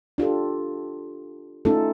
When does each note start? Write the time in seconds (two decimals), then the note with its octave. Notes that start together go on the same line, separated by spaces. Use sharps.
0.18 D4 F4 G4 A4
1.65 A3 C#4 D#4 F4 A4